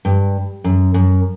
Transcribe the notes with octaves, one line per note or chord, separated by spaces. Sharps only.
G2
F#2
F#2